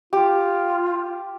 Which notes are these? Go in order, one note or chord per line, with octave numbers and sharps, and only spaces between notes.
F4 G4